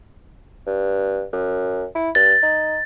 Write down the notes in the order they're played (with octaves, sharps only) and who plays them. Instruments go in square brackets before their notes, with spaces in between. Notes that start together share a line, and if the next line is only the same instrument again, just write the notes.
[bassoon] G2
F#2
E4
[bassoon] G2 [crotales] A6
[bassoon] D#4